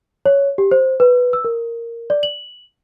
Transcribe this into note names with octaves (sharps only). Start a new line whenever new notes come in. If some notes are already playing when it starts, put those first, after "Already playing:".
C#5
G4
C5
B4
E6
A#4
D5
F#7